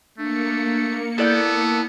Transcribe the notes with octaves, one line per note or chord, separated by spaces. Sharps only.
A3 A#3 D4 C#7
B3 E4 A4 D5 G6